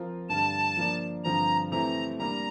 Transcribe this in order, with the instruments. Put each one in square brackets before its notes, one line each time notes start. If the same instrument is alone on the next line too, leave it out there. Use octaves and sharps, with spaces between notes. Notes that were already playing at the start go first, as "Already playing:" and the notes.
Already playing: [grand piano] F3 C4 F4 A#4
[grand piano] G2 D3 G3 [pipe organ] A5
[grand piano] F3 A#3 D4
[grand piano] G2 D3 F3 C4 [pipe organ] A#5
[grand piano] C3 E3 A3 C4 E4 [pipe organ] A#5
[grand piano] G3 A#3 D4 [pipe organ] A#5